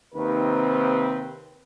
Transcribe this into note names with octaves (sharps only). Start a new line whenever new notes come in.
D#2 C3 D#3 C4 B4